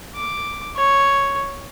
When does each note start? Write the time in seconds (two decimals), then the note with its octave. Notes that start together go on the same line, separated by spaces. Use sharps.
0.15 D6
0.76 C#5